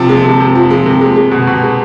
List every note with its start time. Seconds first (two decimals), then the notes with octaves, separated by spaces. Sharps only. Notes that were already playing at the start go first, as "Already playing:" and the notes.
Already playing: C3 F3 A5
0.09 G#3
0.24 C3
0.40 C3
0.55 F3
0.70 G#3
0.86 C3
1.01 G#3
1.16 G#3
1.31 B2
1.47 B2
1.63 G#3